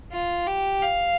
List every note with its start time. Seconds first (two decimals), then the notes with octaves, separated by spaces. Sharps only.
0.12 F4
0.47 G4
0.82 F5